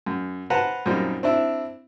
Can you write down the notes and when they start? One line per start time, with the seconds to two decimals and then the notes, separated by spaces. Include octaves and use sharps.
0.06 F#2
0.50 B4 C5 F#5 A5 A#5
0.86 F#2 A#2 G3 C4 D#4
1.23 C4 D4 E4